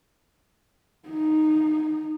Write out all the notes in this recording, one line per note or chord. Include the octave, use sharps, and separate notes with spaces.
D#4